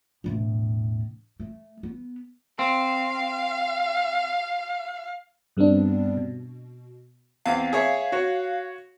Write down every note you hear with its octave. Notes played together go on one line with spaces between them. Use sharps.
E1 A2
A3
B3
C4 F5
G2 G3 B3 C4 D4
B2
E2 C4 F5
G#4 C#5 E5
F#4 C#5